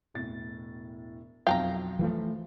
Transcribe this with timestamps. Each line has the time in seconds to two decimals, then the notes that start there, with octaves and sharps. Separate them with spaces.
0.14 E1 A2 A6
1.47 B1 F2 F#3 F5 G5 A5 A#5
1.99 E3 F3 A3